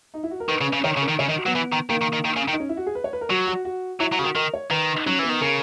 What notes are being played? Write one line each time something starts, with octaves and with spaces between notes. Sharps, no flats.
D#4
E4
F#4
A#4
D#3 B4
C#3
C#3
D#3 C#5
C#3
A#4
D#3
C#3 C#5
D#3 D#5
F#4
F#3 B3
E3
D#3
D#3 A#3
D#3
D#3
D#3
C#3
D#3
D#4
C#4
E4
F#4
G#4
B4
C#5
B4
A#4
F#3 F#4
F#4
F#4
F#3 E4
F#3
C#3 F#4
D#3
D#3 A#4
C#5
D#3 B4
D#4
F#3 C#4
E3 B3
D#3
C#3 A#4